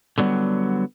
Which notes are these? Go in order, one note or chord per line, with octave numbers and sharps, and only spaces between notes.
D3 F#3 G3 B3